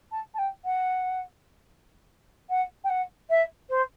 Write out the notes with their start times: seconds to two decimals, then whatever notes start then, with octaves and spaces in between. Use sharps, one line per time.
0.12 A5
0.34 A5
0.39 G5
0.65 F#5
2.50 F#5
2.84 G5
2.90 F#5
3.30 E5
3.70 C5